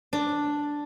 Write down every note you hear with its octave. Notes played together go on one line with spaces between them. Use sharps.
D4